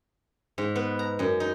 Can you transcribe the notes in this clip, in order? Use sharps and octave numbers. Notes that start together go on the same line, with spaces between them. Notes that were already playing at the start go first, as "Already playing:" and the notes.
G#2
B3
A#5
F#2
D#4